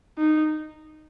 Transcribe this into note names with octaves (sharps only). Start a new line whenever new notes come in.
D#4